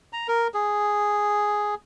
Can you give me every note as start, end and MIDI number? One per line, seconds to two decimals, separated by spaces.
0.13 0.27 82
0.28 0.48 70
0.54 1.75 68